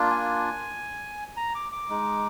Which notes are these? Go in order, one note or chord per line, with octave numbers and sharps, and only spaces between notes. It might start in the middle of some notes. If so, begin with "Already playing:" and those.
Already playing: A#3 D4 F4
G#5
A#5
D6
D6
G#3 D#4